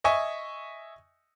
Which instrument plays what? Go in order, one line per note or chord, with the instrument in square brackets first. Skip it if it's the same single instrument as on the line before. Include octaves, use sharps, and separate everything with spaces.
[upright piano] D#5 E5 G#5 C#6